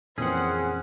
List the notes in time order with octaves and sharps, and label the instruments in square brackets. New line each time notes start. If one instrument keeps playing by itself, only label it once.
[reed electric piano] F2 A#2 E3 [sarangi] C4 [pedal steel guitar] C#4 [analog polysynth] G#4 F#5